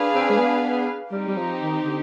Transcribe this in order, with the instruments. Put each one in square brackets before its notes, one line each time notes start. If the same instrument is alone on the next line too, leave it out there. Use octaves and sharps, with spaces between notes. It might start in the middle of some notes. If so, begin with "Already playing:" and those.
Already playing: [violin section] D4 G#4 B4 F5
[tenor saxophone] C4
G#3
B3
[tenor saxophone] G3 [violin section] C4 D#4 G4
[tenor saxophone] G3
F3
D#3
D3